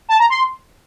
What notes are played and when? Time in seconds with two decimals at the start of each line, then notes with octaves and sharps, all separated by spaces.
0.09 A5
0.19 A#5
0.30 C6